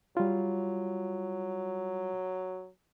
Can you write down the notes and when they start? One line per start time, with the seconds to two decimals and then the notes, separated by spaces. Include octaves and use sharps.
0.17 F#3 G3 F4